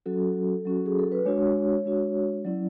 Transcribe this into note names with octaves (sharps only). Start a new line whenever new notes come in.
F#3 C#4 F#4 A4
F#3 C#4 F#4
G#4
A4
B4
G#3 D4 F#4 C#5
G#3 D4 F#4
F#3 C#4 E4 D5